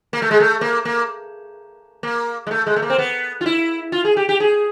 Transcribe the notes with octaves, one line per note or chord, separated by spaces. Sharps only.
A#3
A3
G#3
A3
A#3
A#3
A#3
G#3
A3
G#3
A3
A#3
C4
B3
F4
E4
F4
G#4
G4
G4
G#4